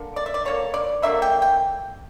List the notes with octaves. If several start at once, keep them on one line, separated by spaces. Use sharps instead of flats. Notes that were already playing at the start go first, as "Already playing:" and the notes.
Already playing: D3 A#3
D5
E5
D5
D3 A#3 C#5
D5
D3 F#3 A#3 E5
G5
G5